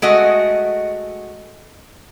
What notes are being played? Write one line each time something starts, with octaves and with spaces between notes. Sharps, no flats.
G#3 A3 F#4 D#5